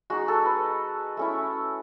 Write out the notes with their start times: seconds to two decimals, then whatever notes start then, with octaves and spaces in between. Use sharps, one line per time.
0.10 G#3 D#4 F#4
0.28 A4
0.45 B4
1.17 A3 C#4 E4